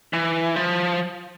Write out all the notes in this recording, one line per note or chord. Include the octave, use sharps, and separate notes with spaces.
E3
F3